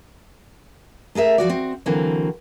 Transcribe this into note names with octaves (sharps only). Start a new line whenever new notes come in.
A3 G#4 A#4 E5
F3 F#3 F#4 D5
C4 F#4
D3 E3 F#3 A#3 C4